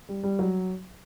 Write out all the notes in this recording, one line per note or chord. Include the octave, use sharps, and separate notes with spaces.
G3
G3
F#3